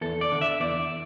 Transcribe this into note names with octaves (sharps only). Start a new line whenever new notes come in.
E2 A4
D5
D3
E5
E2 D5